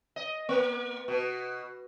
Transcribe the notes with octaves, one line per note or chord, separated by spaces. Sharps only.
D#5
A#3
B2